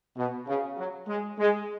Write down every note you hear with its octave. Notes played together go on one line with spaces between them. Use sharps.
B2
C#3
F#3
G#3
G#3